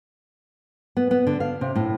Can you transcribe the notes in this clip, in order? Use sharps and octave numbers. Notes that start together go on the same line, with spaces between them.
B3
B3
D3
F5
C3
A2